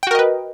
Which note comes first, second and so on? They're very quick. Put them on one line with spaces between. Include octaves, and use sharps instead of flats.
G5 F#4 A#4 D#5 B4